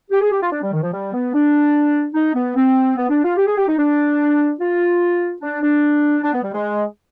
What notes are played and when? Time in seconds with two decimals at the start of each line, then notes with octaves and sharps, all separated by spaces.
0.11 G4
0.21 G#4
0.32 G4
0.41 F4
0.51 D4
0.62 G3
0.72 D#3
0.82 F3
0.92 G3
1.13 B3
1.34 D4
2.14 D#4
2.34 B3
2.55 C4
2.96 B3
3.09 D4
3.23 F4
3.37 G4
3.46 G#4
3.57 G4
3.67 D#4
3.77 D4
4.59 F4
5.41 D4
5.61 D4
6.22 D4
6.33 B3
6.42 G3
6.53 G#3